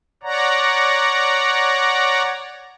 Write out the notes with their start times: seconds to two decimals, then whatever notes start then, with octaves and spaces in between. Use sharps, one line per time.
0.23 C#5 D5 F#5 A#5